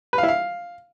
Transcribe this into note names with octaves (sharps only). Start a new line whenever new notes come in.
B4
F5
E4
F5